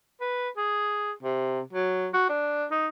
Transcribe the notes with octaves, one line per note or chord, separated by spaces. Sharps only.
B4
G#4
C3
F#3
F#4
D4
D#4